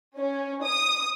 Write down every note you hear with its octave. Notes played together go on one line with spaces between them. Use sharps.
C#4
D#6